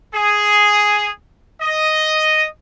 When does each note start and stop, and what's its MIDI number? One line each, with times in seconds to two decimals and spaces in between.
0.15 1.08 68
1.61 2.47 75